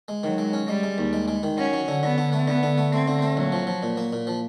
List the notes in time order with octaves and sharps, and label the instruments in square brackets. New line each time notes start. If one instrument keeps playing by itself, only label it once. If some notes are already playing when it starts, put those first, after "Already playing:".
[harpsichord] G#3
[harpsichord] D#3 [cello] F#3
[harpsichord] G#3
C#4
[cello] G3 [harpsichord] G#3
[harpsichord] G#3
D#2
G#3
G#3
D#3
[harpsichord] F#3 [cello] C#4
[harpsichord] F#3
D3
[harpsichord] D3 [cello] B3
[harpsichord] D3
A3
[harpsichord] D3 [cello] B3
[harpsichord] D3
A3
[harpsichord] A3 [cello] C4
[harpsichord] D3
A3
[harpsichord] A#1 [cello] F#3
[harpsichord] F3
F3
A#2
A#3
A#2
F3